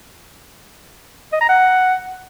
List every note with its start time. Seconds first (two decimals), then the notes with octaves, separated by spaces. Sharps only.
1.33 D#5
1.41 A#5
1.49 F#5